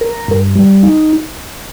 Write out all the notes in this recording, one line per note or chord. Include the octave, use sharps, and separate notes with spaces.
A#4
G2
G3
D#4